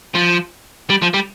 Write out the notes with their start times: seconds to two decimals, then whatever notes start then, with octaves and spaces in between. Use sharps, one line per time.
0.15 F3
0.90 G3
1.02 F3
1.14 G3